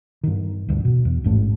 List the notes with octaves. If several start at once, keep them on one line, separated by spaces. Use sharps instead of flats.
G2 D#3
D2 G2
B2
E2
A1 G#2 A3